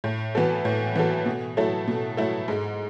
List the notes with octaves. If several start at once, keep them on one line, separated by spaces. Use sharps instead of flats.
A2
E3 B3 F#4 A4
A2
E3 B3 F#4 A4
B2
F#3 A3 E4 A4
B2
F#3 A3 E4 A4
G#2